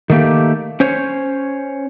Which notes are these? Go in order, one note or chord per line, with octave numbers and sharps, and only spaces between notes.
D#3 A3 A#3 G4
C#4 C5 C#5